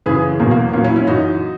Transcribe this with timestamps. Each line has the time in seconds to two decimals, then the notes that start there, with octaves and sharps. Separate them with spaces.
0.06 F#2 C#3 E3 G#4 B4
0.40 E2 B2 F#3 A#3
0.51 A#3
0.73 A#2 F#3 A#3 C#4
0.84 C#4 E4
0.96 C#4 E4
1.07 F#2 E3 D#4 F#4